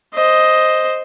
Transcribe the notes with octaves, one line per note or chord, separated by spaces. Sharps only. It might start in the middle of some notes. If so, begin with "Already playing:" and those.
C5 D#5